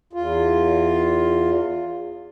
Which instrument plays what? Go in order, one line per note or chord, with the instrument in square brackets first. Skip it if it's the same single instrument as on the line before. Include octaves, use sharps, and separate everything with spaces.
[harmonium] E2 F4